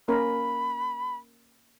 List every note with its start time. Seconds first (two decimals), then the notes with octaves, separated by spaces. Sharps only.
0.08 A#3 C#4 A#4 B5